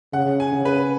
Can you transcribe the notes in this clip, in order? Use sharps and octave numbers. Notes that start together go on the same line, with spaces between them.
C#3 F#5
G#5
C#3
B4